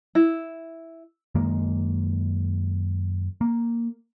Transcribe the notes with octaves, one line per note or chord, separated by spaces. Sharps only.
E4
F#2 D#3 G#3 A#3
A#3